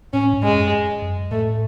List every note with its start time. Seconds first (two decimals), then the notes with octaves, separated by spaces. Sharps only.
0.13 A2 C#4
0.34 G#2
0.43 G#3
0.53 F#2
1.02 F#2
1.31 A2 A3